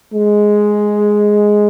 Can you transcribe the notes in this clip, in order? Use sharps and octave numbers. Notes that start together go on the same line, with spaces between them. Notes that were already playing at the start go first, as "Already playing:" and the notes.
G#3